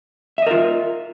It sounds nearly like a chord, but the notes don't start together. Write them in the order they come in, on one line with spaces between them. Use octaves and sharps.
E5 D#5 A#4 F4